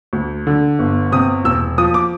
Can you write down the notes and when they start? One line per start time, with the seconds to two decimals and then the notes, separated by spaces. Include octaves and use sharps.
0.13 D2
0.47 D3
0.79 G1
1.12 C3 D#6
1.44 E1 E6
1.78 F3 D#6
1.94 D6